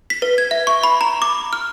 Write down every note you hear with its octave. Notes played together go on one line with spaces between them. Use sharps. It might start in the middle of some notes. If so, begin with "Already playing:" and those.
B6
B4
G#6
E5
C#6
B5
A#5
D6
F6